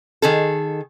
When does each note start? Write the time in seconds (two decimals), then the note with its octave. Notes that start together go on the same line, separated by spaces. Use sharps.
0.22 D#3 G#4 A4